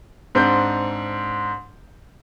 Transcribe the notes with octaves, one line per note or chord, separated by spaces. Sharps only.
G#2 C4 D4 G6